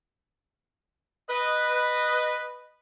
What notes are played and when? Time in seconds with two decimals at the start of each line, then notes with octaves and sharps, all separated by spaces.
1.29 B4 D#5